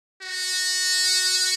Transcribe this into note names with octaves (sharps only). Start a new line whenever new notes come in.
F#4